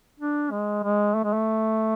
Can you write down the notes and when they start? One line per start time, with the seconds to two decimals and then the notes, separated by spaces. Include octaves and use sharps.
0.20 D4
0.51 G#3
0.84 G#3
1.14 A3
1.24 G#3
1.33 A3